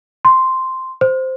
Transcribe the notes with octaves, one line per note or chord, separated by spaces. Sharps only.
C6
C5